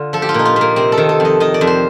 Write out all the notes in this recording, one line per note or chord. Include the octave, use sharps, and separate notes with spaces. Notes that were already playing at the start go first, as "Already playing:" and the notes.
Already playing: D3 F4
F3 A4
G4
F4
A#2 D#4
F4
A#2 A#3
C3 C4
A4
D#3
A4
F2 D#5
D#3 D#5
D5
F2
C5